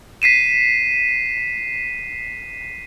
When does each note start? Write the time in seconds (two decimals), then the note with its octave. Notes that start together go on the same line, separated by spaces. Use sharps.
0.22 B6 C7 D#7 E7